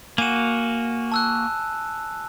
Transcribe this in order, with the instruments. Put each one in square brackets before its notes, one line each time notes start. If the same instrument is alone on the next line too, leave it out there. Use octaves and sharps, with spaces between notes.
[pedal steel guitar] A#3 F#4 [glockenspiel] G#5 D#7 E7
[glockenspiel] A5 E6 F#6